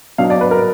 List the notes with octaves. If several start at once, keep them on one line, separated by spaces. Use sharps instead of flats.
B2 F#3 D4 F5
D5
B4
A#4